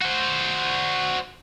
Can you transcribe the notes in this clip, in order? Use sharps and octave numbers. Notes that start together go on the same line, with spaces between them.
F#4 C5